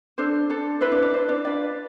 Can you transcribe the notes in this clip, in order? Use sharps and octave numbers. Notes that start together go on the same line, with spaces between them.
D4 A4 C5
D4 A4
E4 B4 C5
D4 D5
D4 D5
E4 B4 C5
D4 D5
D4 F4 B4 D5